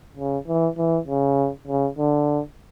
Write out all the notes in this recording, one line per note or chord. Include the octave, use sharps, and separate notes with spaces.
C#3
E3
E3
C#3
C#3
D3